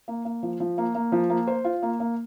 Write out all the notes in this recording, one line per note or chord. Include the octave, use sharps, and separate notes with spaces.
A#3
A#3
F3
F3
A#3
A#3
F3
A#3
C5
F4
A#3
A#3